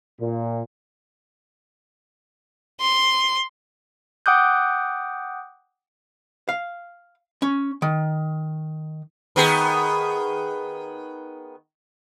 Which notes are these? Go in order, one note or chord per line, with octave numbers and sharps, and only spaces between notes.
A#2
C6
F#5 G5 D6 D#6 F#6 G6
F5
C#4
D#3
D#3 B3 G#4